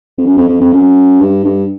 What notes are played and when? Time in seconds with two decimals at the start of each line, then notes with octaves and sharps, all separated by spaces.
0.18 F2
0.25 F#2
0.37 F2
0.48 F2
0.61 F2
0.73 F#2
1.21 G2
1.44 G2